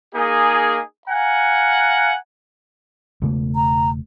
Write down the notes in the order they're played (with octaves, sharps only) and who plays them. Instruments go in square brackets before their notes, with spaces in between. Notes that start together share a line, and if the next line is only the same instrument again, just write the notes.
[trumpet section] A#3 D#4 G#4
F5 F#5 G#5 A#5
[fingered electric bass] E1 C#3 A3
[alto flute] A#5